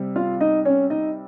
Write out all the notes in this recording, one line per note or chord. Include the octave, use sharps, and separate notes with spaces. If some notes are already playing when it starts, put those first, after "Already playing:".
Already playing: C3 G3 C4
F4 F5
D#4 D#5
C#4 C#5
D#4 D#5